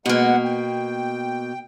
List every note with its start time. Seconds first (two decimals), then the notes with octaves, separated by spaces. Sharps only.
0.06 B2 G#3 A#3 B3 F#5
0.44 G5